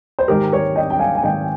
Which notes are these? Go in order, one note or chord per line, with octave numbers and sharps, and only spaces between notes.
C5
G#2 D#3 G#3 G4 A#4
A#4 C#5
D#5 G5
G5
F5 G#5
G#5
G#2 D#3 G#3 D#5 G5